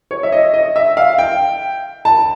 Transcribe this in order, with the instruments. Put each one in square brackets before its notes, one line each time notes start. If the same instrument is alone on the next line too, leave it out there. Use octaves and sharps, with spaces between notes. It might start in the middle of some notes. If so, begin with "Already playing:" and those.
[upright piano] C#5
E5
D#5
D#5
E5
F5
G5
A5